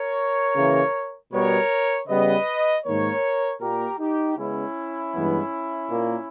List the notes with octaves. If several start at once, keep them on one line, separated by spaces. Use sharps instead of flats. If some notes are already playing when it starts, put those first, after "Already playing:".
Already playing: A#4 C#5
C#3 E3 A#3
B2 G3 B3 A#4 C#5
C#3 G3 B3 B4 D#5
G#2 D#3 A#3 A#4 C#5
A#2 A#3 G4 A#4
D#4 G4
C#3 G#3 B3 C#4 E4
G2 E3 G#3 B3
A#2 A#3